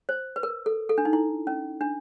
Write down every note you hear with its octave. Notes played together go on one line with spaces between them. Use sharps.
C5
B4
A#4
A4
A4
D4
D#4
E4
C#4
D4